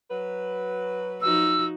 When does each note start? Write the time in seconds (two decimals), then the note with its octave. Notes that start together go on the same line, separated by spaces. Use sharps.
0.11 F#3 B4
1.22 F3 D#4 F#4 E6